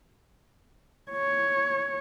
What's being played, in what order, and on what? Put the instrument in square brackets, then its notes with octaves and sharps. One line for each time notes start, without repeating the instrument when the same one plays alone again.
[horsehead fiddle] C#5